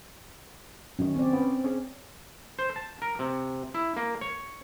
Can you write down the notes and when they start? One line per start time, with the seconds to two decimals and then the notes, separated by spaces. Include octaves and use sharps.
0.99 F#2 D#3 C#4
1.16 C4 D5
1.33 B3 C#4
1.64 C#4 G#4 C#5
2.59 C5
2.76 A5
3.02 A#4
3.19 C3
3.74 E4
3.96 A#3
4.21 C#5